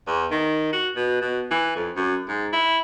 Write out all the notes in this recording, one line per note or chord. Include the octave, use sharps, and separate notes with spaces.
E2
D#3
F#4
B2
B2
E3
F2
F#2
G#2
E4